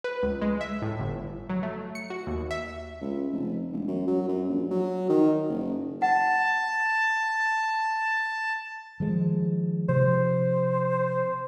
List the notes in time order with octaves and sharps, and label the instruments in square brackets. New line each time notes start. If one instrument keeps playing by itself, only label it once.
[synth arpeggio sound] B4
C#2
G#3
E5
A2
G1
F#3
A3
C#7
F#4
D#2
E5
[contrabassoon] C#2
F1
E1
F#2
F#3
F#2
A#1
F#3
D#3
F#1
[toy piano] F#5 [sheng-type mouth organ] A5
[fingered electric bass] D#3 F3 G#3
[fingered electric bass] C3 F3 [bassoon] C5